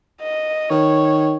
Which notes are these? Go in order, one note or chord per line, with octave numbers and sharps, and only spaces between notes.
D#5
D#3 C#5